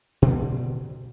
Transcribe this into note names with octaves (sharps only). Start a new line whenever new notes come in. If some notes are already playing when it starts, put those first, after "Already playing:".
B2 D3 B3 C4